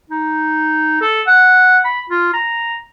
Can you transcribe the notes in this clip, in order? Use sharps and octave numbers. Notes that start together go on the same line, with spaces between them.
D#4
A4
F#5
B5
F4
A#5